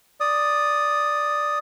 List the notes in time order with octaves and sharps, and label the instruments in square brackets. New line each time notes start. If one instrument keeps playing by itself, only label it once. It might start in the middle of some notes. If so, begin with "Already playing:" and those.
[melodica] D5 D#6